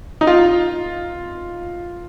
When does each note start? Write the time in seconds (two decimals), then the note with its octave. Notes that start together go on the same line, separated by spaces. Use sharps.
0.21 D#4
0.27 F4